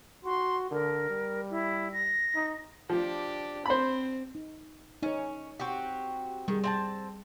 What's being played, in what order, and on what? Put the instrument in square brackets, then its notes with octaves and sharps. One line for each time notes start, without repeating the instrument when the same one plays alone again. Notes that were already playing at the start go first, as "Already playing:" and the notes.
[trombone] F#4 [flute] C6
[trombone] D3 [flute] A#4
[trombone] G3
[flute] E4
A#6
[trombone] D#4
[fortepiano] F3 [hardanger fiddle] D4 G4
[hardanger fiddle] C4 [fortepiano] C5 B5
[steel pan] D#4
[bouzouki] C#4 [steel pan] D#4 C#5
[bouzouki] C4 F#4 G4
[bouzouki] D#3 [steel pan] G3 G#4
[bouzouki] C4 G#5 A5